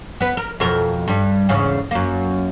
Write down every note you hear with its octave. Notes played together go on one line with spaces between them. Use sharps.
B3 B4
A#4
F2 B2 A#4
G2 G3
E2 G#2 C#3
F#2 A#3